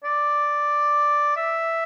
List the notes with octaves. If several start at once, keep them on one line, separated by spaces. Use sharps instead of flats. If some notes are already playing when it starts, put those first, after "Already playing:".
D5
E5